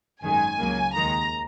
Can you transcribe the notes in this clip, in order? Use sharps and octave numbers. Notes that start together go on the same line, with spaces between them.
G#1 F#2 D#3 G#3 G#5
C#2 C#3 F#3 A#3
D#2 D#3 G#3 A#5